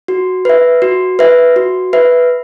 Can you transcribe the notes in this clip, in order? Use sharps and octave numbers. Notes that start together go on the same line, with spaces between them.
F#4
B4 E5
F#4
B4 E5
F#4
B4 E5